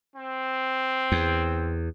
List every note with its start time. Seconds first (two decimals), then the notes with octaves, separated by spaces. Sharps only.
0.16 C4
1.12 E2